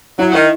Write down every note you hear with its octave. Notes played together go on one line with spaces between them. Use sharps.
F#3 E4
D#3